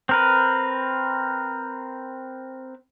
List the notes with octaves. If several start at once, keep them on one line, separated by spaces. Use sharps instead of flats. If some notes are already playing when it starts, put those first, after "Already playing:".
C4 A#4 B4